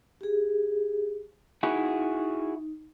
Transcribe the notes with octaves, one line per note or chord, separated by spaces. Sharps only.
G4 G#4
D#4 E4 F#4 G#4